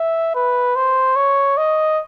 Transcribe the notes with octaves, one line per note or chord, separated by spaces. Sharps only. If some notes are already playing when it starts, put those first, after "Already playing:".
Already playing: E5
B4
C5
C#5
D#5